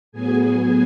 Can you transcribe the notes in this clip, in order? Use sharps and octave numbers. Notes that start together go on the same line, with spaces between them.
A2 F#3 B3 G#4 G#5